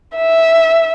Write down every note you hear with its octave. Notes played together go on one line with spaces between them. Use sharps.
E5